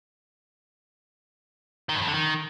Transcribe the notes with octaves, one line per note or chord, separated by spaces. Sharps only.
D#3
G2
F2
D3
D#3